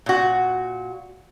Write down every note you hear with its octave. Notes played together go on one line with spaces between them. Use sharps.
A#2 F#4